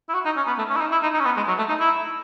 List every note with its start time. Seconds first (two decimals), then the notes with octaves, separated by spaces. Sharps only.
0.09 E4
0.14 F#4
0.25 D#4
0.37 C#4
0.47 B3
0.58 A3
0.69 C#4
0.76 E4
0.81 D#4
0.92 E4
1.03 D#4
1.13 D#4
1.20 C#4
1.25 B3
1.37 G#3
1.48 F#3
1.58 A3
1.69 D#4
1.80 E4